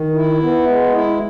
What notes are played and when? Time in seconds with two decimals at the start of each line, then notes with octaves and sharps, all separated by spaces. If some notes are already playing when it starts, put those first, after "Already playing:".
Already playing: D#3
0.14 E4
0.42 B3
0.68 G#3
0.95 E4